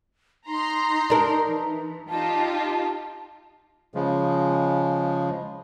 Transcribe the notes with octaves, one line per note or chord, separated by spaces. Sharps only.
D#4 A#5 C6
D4 A#4
E3
D#4 F4 G4 A5
C#3 F3 G#3